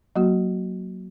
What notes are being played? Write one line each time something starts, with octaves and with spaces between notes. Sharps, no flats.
F#3 A#3 F#4